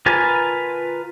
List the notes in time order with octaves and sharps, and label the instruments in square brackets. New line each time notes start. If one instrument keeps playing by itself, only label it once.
[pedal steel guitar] F4 A#4 B4 G#5 A5